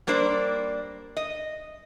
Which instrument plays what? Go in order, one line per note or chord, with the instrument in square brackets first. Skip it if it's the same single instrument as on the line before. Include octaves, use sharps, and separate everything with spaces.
[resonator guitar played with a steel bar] G3 A#3 D4 C5 D5
D#5